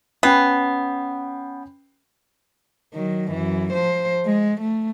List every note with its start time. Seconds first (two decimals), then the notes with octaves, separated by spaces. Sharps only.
0.23 B3 C#4 G5 C7
2.94 D#3 F#3
3.31 F#2 E3
3.73 F3 C5
4.26 G#3
4.61 A3